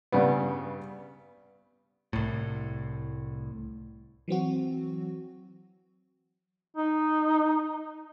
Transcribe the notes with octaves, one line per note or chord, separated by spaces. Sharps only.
G2 C#3 G3 B3
C2 A2
E3 F#3 C4 F#4
D#4